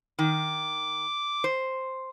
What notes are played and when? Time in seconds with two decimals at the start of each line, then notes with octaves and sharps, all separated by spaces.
0.19 D#3 D6
1.44 C5